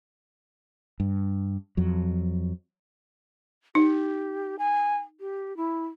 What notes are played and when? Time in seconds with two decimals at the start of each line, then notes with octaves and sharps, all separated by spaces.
1.00 G2
1.77 F2 F#3
3.75 D#4 G4
4.59 G#5
5.20 G4
5.57 E4